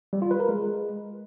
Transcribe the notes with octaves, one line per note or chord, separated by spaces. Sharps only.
G3
F4
B4
A#4
G#3